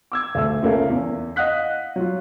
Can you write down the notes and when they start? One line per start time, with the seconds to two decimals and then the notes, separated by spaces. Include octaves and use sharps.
0.12 D6 E6 G#6
0.35 D2 A3 E6
0.62 C#2 C#3 A#3 C#4 A4 E5
0.90 E2
1.36 D#5 F5 F#5 D#6 F#6 B6
1.96 F#3 F4